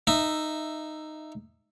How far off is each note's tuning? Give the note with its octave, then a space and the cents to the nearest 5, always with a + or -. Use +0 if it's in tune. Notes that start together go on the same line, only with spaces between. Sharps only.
D#4 -10 E5 +5